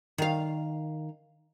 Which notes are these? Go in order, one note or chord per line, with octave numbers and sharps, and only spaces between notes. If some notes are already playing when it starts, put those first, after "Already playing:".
D#3 F5